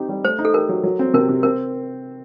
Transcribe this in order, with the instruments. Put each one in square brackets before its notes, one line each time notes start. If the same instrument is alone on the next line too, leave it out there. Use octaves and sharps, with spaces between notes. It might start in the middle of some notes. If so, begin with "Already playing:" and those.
Already playing: [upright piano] C4 D#4 G4
G3
[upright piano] A3 [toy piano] C5
[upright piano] D#4
[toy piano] A4
[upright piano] G4 [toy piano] A#4
[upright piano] F#3
F#3
C4
[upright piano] C3 [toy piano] A#4
[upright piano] C3
[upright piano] C4 [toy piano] A#4